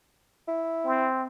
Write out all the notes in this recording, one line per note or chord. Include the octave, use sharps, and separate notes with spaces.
E4
C4